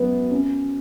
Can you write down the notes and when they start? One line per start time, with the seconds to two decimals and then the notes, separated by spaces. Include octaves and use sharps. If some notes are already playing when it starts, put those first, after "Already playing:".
Already playing: F#2 B3
0.31 C#4